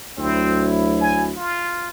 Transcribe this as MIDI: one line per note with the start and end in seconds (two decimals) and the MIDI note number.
0.17 1.35 38
0.17 1.35 54
0.17 0.71 60
0.17 1.35 64
1.00 1.24 80
1.37 1.89 65